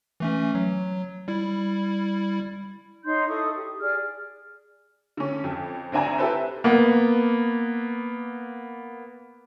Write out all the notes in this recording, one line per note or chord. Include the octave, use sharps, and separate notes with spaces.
E3 A3 C#4
F#3
G3 E4
D#4 C#5 C6 G6
E4 A4 C#6 D#6
G4
G#4 D5 F6
D3 C#4
F2
D2 C4 D4 G#5 A#5
E4 G4 A4 B4 C5 E5
A#3 B3